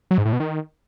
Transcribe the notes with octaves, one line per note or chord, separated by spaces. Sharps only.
F#3
G#2
A2
B2
D#3